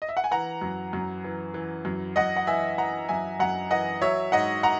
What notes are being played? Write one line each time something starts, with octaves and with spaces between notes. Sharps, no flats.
D#5
E5
F#5
G#5
E3 F#5 A#5
F#2
F#2
E3
E3
F#2
F#2 D#5 F#5
F#5
E3 E5 G#5
E3 F#5 A#5
F#2 E5 G#5
F#2 F#5 A#5
E3 D#5 F#5
F#3 C#5 E5
G#2 D#5 F#5
F#5 A#5